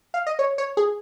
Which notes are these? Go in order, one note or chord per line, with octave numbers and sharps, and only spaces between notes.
F5
D#5
C#5
C#5
G#4